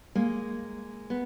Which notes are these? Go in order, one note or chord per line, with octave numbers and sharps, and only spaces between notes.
G#3 A#3
B3